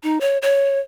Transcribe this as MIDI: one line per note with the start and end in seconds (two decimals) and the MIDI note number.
0.03 0.18 63
0.21 0.38 73
0.42 0.79 73